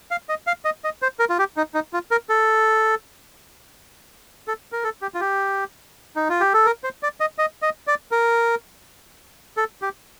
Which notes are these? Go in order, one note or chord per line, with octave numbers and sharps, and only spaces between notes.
F5
D#5
F5
D#5
D#5
C5
A#4
F4
G4
D#4
D#4
F4
A#4
A4
A4
A#4
A4
G4
F4
G4
D#4
F4
G4
A4
A#4
C5
D5
D#5
D#5
D#5
D5
A#4
A4
G4